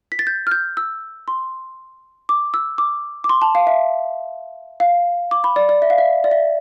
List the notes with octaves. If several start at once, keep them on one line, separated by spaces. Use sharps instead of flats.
B6
A6
G6
F6
G6
E6
C6
D6
E6
D6
D6
C6
A5
F5
E5
F5
D6
B5
D5
D5
E5
F5
E5
D5
E5